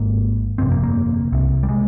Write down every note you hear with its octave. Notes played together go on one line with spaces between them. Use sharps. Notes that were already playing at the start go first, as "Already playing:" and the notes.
Already playing: G#1 G#2 A#3
G1 F2 C3 C4
A#3
A#3
C2 C3
G3
G#3